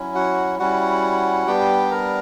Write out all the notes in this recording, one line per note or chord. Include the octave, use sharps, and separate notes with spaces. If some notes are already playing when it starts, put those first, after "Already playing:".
Already playing: F#3 C#4 E4
F#4 F#5
G3 C#4 E4 F#4 F#5
G3 B3 D4 G4 G5
A#4 A#5